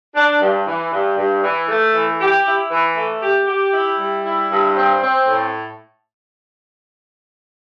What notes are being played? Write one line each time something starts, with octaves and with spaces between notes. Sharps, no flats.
D4
G2
E3
G2
G2
E3
A3
E3
G4
E4
E3
A3
G4
G4
E4
G3
E4
G2
C4
C4
A2